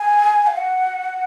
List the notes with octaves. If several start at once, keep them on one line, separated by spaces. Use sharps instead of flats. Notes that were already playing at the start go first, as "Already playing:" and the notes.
Already playing: G#5
F5
F#5